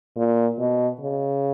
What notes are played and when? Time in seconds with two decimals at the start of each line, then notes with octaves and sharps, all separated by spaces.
0.17 A#2
0.59 B2
1.01 C#3